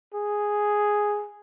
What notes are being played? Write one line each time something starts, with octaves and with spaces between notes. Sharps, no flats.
G#4